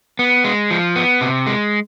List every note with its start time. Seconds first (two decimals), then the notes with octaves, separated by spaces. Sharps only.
0.19 B3
0.44 G#3
0.70 F3
0.96 B3
1.21 C3
1.47 G#3